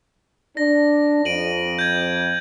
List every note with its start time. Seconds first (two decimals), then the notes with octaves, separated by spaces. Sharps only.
0.57 D4 A#6
1.25 F2 D7 D#7 F#7
1.79 G6 G#6